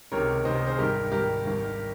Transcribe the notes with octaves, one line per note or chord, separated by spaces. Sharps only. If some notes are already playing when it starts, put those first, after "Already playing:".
C#2 C3 D#3 A#4 C#5
C#2 C3 D#3 C5 D#5
C5 D#5
G#4 C5
G#1 G2 D#3 G4 A#4
G#1 G2 D#3 G4 A#4
G#1 G2 D#3